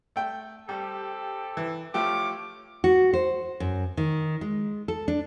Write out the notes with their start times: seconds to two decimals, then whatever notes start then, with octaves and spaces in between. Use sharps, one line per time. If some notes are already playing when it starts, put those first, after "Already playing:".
0.16 A3 G5
0.69 G3 C4 G4 A4
1.57 E3
1.94 F3 A3 G4 C#5 F5 D6
2.84 F#4
3.13 C5
3.60 F#2
3.97 D#3
4.41 G#3
4.88 A4
5.08 D4